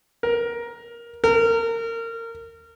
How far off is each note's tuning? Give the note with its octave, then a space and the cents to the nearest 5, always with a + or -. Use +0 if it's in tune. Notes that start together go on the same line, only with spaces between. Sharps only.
A#4 +15
A#4 -25